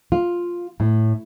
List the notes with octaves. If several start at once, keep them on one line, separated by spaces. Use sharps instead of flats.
F4
A2